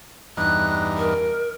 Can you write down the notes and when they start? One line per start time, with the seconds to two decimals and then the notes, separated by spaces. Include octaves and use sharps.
0.37 E2 G2 D#4 F#6
0.98 A#4